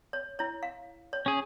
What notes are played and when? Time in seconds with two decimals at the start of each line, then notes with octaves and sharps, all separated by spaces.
0.13 C#5
0.39 E4 C#5
0.63 F5
1.13 C#5
1.26 C#4 G#4